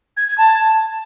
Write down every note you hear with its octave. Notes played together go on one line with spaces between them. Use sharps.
G#6
G#6
A5